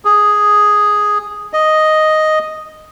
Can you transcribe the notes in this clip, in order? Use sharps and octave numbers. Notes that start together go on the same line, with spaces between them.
G#4
D#5